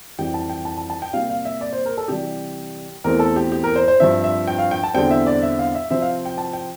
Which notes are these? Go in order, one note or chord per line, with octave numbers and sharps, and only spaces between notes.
F2 E3 G3 G5
A5
G5
A5
A5
A5
G5
C3 G3 A#3 F5
F5
E5
D5
C5
A#4
A4
C3 E3 G3 G4
E2 E3 A3 C4 A#4
A4
G4
G4
A#4
C5
C5
G2 F3 C4 E5
E5
G5
F5
G5
A5
E2 D3 G3 C4 G5
E5
D5
E5
F5
E5
C3 F3 C4 E5
F5
G5
A5
G5